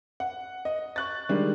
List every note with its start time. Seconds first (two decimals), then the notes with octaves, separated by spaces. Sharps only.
0.20 F#5
0.65 D#5
0.96 C#6 F#6 A6
1.29 D#3 G3 G#3 D4